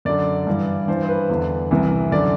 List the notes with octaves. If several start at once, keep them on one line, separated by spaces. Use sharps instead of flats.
F#2 D3 D5
G2 E3
G2 E3 C5
C5
B4
E2 D3
C2 C3 E3
F#2 D3 D5